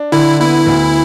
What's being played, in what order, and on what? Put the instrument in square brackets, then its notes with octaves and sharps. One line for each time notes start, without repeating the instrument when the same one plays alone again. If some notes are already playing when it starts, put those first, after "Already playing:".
Already playing: [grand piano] D4
[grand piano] D3 [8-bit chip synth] E4
[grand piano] B3 [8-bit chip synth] E4
[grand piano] D2